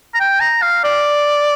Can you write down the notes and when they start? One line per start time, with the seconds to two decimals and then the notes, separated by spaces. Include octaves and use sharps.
0.14 A#5
0.20 G5
0.40 A#5
0.62 F5
0.84 D5